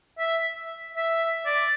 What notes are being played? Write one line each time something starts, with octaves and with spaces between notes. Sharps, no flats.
E5
E5
D5